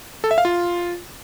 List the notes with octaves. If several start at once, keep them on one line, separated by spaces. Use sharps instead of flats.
A4
E5
F5
F4